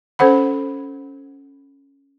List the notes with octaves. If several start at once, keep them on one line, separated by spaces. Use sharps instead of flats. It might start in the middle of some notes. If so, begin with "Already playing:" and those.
C#4 A4 C5 F#5 B5